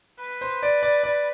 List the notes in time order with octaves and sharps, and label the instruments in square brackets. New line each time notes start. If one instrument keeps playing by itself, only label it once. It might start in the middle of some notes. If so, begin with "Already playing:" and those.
[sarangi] B4
[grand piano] C5
D5
D5
D5